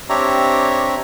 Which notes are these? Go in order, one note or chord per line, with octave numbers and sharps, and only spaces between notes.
C4 D4 G4 C#5 E5 A#5